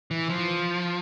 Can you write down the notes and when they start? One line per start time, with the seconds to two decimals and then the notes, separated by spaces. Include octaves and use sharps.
0.11 E3
0.30 F3